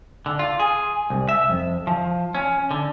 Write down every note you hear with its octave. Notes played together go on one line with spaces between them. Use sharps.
D3
F4
G#4
C2
E5
F2
F3
C#4
D3